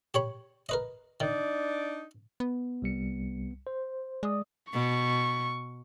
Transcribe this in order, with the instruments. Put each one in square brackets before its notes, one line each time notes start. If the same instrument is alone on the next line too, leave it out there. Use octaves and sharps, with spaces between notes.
[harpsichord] G4 C#5 B5
A#4 B4 D#5
[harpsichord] D#3 [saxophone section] D4 D#4 D5
[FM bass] B3
[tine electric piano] C2 G3 C#7
C5
[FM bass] G#3 [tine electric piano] D5 D#6
[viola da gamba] B2 [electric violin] C#6